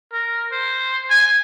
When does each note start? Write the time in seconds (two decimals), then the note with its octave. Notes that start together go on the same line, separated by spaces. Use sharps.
0.13 A#4
0.52 C5
1.10 G#5